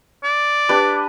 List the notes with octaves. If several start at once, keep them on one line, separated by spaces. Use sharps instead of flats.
D5
D4 G4 B4